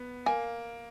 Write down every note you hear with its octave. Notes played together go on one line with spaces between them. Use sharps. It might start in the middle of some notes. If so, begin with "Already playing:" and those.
Already playing: B3
A#3 G#5